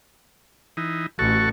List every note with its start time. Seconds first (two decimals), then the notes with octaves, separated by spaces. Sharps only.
0.77 E3 D#4
1.19 A1 F#4 A4 C#6